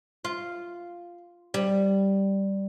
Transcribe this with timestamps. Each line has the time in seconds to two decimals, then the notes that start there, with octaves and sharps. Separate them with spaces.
0.25 F4
1.54 G3